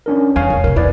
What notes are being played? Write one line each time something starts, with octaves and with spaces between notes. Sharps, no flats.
C#4 D4 A#4
E2 C#5 F5 G#5
F1
A2 C3 A#4
E2 E4 B4 D5